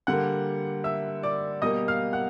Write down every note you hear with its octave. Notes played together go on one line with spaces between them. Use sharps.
D3 G3 A#3 F#5 F#6
E5 E6
D5 D6
B2 G3 A#3 D#5 D#6
F5 F6
F#5 F#6